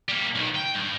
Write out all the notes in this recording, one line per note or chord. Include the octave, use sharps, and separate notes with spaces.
G3 A#3
B1 D#3
G5
G2